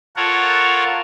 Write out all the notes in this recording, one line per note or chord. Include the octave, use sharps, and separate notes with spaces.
F4 A4 A#4 C#5 F#5